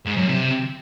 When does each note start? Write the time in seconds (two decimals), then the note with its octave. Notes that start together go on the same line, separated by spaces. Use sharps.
0.05 G#2
0.17 F#2
0.28 C3